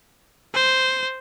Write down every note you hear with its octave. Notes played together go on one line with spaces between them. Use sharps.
C5